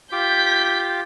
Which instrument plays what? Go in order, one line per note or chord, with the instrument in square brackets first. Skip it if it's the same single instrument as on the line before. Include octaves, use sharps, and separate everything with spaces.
[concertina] F4 G4 D6 [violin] G6 B6